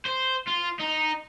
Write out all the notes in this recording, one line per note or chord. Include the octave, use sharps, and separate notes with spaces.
C5
F4
D#4